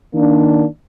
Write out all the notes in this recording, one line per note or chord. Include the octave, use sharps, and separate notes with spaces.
D#3 A#3 D4